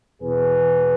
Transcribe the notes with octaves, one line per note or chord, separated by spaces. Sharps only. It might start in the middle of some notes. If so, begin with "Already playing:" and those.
E2 B2 B3 G#4 B4